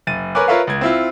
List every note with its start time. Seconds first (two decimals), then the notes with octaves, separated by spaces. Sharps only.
0.07 F#1 A6 D#7
0.35 A#4 B4 C#5 G#5 D6 F#6
0.48 F4 A#4 B4 C#5 E5 F5
0.67 C#2 G#6
0.81 C4 E4 F4